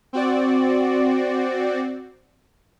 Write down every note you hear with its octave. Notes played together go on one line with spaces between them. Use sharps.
C4 F#4 D5